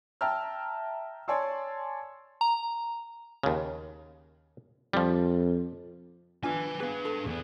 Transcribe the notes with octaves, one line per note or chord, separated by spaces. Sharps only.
E5 G5 A5 A#5 E6 F6
C#5 D5 G#5 A5 C6 E6
A#5
D#2 C#3
F2 F3 G3
B3 D4 F4 B4 G#5
B3 D4 G#4 B4
A4
E2 B3 G#4